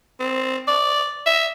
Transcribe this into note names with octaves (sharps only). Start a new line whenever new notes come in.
C4
D5
E5